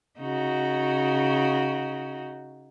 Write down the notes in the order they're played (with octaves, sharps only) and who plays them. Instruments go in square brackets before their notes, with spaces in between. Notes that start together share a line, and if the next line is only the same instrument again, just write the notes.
[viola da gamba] C#3 D#4 F#4